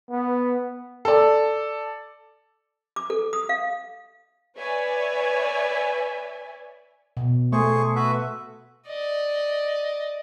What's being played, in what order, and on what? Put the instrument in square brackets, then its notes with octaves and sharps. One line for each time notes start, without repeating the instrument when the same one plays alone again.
[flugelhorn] B3
[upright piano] A4 D5
[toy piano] D6
A4
D#6
F5
[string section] B4 C#5 D5 E5 G#5
[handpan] B2
[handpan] A3 [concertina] G#4 C5 C#6
[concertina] F#4 B4 E5
[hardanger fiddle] D5 D#5